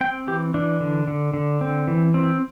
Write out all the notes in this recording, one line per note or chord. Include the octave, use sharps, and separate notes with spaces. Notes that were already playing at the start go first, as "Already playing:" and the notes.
C4 G5
E3 G4
E3 D4
D3
D3
D3
C4
E3
C4